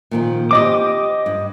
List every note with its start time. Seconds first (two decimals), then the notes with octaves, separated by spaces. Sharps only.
0.11 A#2 D#3 F3
0.51 C4 G4 D#5 D6
1.26 G2